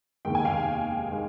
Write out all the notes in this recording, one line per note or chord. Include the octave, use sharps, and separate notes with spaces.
F1 D#2 D#3 G#3 G5
G#5
F5 G5
D#3 G#3